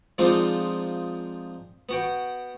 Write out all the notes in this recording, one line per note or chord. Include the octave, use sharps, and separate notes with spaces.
F3 G#3 C4 D4 D#4 F4
B3 F#4 G5